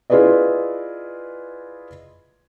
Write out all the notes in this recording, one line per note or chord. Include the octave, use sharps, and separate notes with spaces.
E4 F4 G#4 B4 D5 D#5